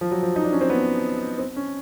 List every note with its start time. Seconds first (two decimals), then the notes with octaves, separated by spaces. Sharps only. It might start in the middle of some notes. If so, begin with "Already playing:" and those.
0.01 F3
0.11 F#3
0.23 F3
0.36 D#4
0.44 D4
0.53 C#4
0.61 C4
0.70 B3
1.38 C4
1.56 C#4